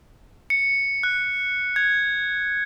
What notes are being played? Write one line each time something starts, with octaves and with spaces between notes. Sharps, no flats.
C#7
F#6
G#6